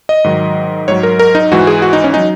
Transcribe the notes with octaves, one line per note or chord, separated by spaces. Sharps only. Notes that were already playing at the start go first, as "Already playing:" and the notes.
D#5
G#2 D#3 F#3
G#2 F#3 C#5
A#4
A#4
D#4
G#2 E3 G#3 F#4
G#4
F#4
D#4
C#4
F#3 D#4